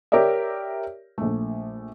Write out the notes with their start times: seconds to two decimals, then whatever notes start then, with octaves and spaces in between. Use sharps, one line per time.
0.12 G4 A#4 C#5 D5 E5
1.18 A#1 A3